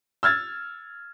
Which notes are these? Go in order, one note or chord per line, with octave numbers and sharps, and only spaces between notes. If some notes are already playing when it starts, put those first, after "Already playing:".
E6 F6 G#6 A6